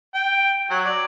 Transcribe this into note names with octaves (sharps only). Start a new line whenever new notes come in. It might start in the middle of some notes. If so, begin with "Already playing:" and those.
G5
F#3 F#4
D5